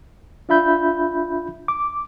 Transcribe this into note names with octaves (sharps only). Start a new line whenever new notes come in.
D4 F4 E5 B5 G6
D6